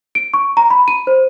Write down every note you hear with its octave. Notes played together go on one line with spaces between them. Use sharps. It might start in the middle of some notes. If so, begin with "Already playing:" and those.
D7
C#6
A#5
B5
D#7
C5